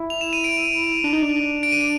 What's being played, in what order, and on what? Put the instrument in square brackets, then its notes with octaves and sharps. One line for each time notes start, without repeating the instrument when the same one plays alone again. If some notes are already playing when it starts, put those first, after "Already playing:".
Already playing: [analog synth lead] E4
[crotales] F7
E7
D#7
D7
[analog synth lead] D4
D#4
D4
[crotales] D7
D#7
D7